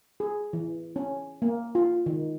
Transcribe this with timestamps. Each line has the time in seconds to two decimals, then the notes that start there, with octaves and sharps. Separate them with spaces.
0.20 G#4
0.53 E3
0.96 C#4
1.42 A#3
1.75 F4
2.06 D#3